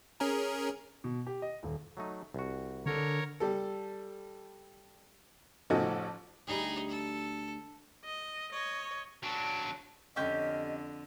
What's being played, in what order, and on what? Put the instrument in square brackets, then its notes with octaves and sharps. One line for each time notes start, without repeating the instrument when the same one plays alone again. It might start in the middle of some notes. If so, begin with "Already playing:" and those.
[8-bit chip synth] C#4 G#4 A#4
[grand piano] B2
G4
D#5
D#1
[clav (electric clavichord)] F#3 A3 D#4
C2 F#4
[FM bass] D3 [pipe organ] A#4 C#5
[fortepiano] G3 A4
A1 F3 D#4 F#4 A4 G#5
[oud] D2 G3 [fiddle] D#4 G#4
[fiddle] A4
[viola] D#5
C#5 D#5
[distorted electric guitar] F#3 D4
[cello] F2 D3 [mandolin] C#4 G4 [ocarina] D#5